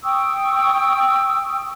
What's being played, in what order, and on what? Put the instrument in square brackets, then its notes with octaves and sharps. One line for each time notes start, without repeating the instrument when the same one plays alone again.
[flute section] G5 C#6 D#6 E6